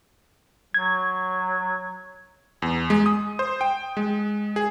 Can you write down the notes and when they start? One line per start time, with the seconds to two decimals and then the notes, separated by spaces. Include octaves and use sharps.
0.74 F#3 G#6
2.62 E2
2.90 G#3
3.06 D#6
3.39 C5
3.61 G5
3.97 G#3
4.56 G#4